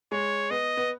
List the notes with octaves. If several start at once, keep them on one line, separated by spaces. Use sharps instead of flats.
G#3 C#5
B3 D#5
B3